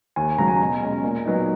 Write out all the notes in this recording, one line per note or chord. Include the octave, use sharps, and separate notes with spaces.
D#2 G#5
C#3 F#3 A#5
G#5
B2 A#5
G#3 C#4
A#2
F#3 B3 D#4